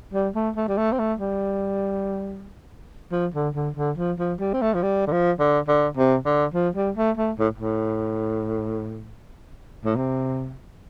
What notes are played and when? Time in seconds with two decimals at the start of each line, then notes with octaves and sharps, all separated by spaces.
0.14 G3
0.35 A3
0.56 A3
0.68 G3
0.78 A3
0.92 C4
0.99 A3
1.20 G3
3.12 F3
3.34 D3
3.55 D3
3.76 D3
3.98 F3
4.19 F3
4.40 G3
4.54 C4
4.62 A3
4.74 F3
4.83 G3
5.07 D3
5.12 F3
5.40 D3
5.68 D3
5.97 C3
6.25 D3
6.54 F3
6.76 G3
6.97 A3
7.17 A3
7.39 A2
7.58 A2
9.85 A2
9.96 C3